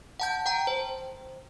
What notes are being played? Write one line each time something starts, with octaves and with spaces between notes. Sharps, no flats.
F#5 A5 G6
G5 A5 A#5
C5